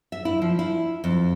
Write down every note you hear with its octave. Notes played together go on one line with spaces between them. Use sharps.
E5
E4
F3
E4
F2